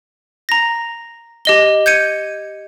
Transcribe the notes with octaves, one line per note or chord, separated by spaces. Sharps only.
A#5 A#6
G4 D#5 G7
G6 G#6 C#7 D#7